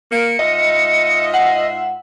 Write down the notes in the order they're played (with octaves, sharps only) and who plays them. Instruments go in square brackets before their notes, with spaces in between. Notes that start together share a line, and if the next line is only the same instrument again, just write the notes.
[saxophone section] A#3 [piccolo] C#7
[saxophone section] G#2 F4 E5 [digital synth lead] D#5
[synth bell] F#5 [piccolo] C7